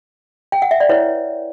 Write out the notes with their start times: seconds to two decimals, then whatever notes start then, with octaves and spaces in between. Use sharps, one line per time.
0.52 G5
0.62 F#5
0.71 E5
0.80 D5
0.89 E4 B4 C#5